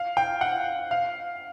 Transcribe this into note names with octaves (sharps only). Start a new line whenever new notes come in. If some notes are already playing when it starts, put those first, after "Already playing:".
Already playing: F5
G5
F#5
F5